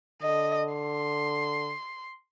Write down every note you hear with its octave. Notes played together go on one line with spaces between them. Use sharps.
D3 D#5
C6